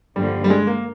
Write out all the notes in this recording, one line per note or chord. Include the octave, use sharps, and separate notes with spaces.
G2 D3 F3 G3 A#3
G3
G#3
A#3